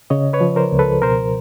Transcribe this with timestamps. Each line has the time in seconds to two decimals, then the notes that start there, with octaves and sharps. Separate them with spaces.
0.10 C#3 C#5 D#5
0.33 B4 C#5
0.41 F3
0.56 A#4 C5
0.72 C#2
0.79 A4 B4
1.02 B2 A#4 C5